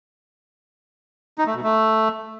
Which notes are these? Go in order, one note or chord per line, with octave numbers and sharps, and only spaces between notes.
D#4
A3
B2
A3